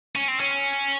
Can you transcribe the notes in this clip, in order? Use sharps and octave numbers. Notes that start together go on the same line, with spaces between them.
C#4
C4
C#4